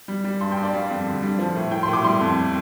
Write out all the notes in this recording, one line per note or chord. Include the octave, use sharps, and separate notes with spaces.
G3
G3
G2 C6
G5
G2
D5
G3 F5
F2
D3
G3
F3
A2
A2 G5
C6
A2
D6
G3 C6
F2